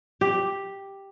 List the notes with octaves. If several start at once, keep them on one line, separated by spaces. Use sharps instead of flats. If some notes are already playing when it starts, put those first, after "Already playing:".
G4